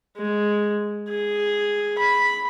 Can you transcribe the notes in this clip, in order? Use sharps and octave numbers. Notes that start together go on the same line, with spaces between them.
G#3
G#4
B5